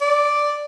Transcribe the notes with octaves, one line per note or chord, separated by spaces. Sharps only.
D5